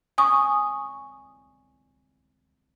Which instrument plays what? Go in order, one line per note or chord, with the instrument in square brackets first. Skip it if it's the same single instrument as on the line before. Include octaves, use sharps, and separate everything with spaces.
[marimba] G#5 C#6 D#6